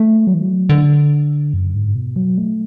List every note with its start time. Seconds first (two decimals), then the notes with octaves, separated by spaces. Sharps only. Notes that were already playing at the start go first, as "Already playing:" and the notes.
Already playing: A3
0.27 F#3
0.34 E3
0.41 F#3
0.69 D3
1.54 F#2
1.75 G#2
1.95 B2
2.16 F#3
2.38 A3